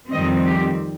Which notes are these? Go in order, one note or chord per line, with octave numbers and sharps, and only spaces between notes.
F2 D#3 G3 C4 D#5
G4